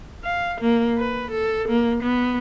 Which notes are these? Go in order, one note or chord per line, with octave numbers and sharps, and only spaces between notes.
F5
A#3
B4
A4
A#3
B3